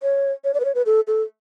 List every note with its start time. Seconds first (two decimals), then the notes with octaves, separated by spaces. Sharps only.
0.03 C#5
0.44 C#5
0.54 D5
0.60 B4
0.65 C#5
0.75 B4
0.86 A4
1.07 A4